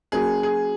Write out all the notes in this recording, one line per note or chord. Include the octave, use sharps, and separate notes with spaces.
F#3 A#3 C#4 G#4
G#4